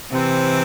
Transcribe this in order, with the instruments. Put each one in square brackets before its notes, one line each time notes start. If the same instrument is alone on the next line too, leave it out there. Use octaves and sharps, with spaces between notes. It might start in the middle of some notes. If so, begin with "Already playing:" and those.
[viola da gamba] C3 E3 [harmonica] C4